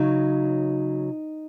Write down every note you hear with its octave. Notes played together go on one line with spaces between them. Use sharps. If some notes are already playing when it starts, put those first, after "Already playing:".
Already playing: C#3 F#3 D#4